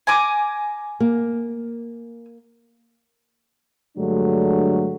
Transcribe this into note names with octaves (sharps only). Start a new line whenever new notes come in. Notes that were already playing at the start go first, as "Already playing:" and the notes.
G#5 A#5 D6
A#3
G2 D3 F#3 G#3 A3 D4